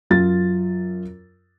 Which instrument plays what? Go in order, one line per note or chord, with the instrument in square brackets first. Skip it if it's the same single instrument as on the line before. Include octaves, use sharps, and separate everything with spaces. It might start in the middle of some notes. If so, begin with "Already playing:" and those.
[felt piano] F#2 F4 A6